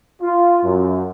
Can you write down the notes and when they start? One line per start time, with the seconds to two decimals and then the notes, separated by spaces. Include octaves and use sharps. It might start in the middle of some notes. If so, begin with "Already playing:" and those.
0.21 F4
0.62 F#2